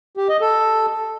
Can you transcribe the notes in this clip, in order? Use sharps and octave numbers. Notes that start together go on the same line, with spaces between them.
G4
D#5
A4